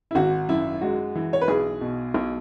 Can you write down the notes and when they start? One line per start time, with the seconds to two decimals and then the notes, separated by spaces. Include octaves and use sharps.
0.11 E4
0.15 G#1 F#4
0.49 F#2 E4
0.81 G#3 F#4
1.15 E3
1.33 C#5
1.41 B4
1.48 B1 G#4
1.81 B2
2.14 B1